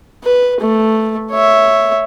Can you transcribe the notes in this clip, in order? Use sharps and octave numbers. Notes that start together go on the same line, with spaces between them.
B4
A3
C#5 E5